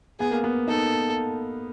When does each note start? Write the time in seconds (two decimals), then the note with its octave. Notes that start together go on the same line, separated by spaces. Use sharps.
0.20 B3 G#4
0.31 A#3
0.44 B3
0.68 D#4 A4